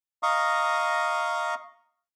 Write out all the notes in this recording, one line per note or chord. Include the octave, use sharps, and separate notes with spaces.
D#5 F5 A#5 C#6 D#6